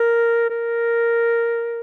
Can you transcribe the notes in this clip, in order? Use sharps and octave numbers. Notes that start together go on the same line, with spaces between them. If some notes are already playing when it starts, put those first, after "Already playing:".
Already playing: A#4
A#4